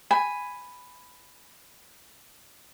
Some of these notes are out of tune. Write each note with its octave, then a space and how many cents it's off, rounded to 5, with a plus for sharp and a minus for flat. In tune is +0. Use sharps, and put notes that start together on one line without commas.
G#5 +0 B5 +5